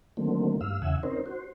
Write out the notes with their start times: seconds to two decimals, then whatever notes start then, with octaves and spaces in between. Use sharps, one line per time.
0.17 D3 D#3 F#3 A3 A#3 C4
0.61 G2 F5 E6
0.82 E2 C#3 E5 F#5 G#5 E6
1.03 C4 C#4 D#4 A#4 C5
1.26 F#4 C5